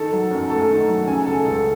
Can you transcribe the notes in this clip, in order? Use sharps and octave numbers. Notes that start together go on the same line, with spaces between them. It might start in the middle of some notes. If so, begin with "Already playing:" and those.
Already playing: D#3 A4
F#3
F#2
A3 A4
D#3
F#3
C#3 G#5
G#3 A4
C#2 A4